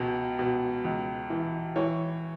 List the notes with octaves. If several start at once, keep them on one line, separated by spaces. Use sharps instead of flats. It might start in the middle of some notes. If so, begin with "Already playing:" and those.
Already playing: C#2 B2
B2
C#2
E3
E3 C#5